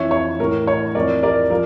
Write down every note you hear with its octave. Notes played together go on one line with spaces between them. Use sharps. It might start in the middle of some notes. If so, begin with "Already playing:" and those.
Already playing: F2 E3 C#5 E5
C#5
A2 E3 A#4
C#5
F2 E3 A#4 D5
A#4 D5
F3 A#4